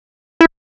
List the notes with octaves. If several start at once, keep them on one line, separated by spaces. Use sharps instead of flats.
E4